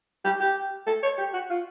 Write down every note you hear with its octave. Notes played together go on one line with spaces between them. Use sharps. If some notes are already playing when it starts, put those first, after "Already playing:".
G4
G4
A4
C#5
G4
F#4
F4